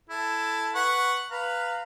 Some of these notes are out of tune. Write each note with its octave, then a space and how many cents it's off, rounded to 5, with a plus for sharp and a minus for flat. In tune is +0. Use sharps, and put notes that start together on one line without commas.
E4 +10 A4 +0
B4 +0 F#5 +0 C#6 +0
B4 +0 F5 +0 A#5 -30